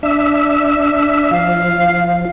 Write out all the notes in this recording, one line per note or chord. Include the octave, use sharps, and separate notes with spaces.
D4 E5
F3 F5